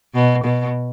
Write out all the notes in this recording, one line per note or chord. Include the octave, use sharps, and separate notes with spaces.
B2
B2